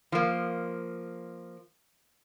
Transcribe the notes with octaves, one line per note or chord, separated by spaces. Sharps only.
F3 A#3